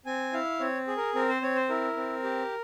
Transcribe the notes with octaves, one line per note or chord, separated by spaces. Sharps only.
C4 G#5
E4 F5
C4 C#5
G#4
A#4
C4 A#4
C5
C4 C#5
C5
E4 A#4
C4
G4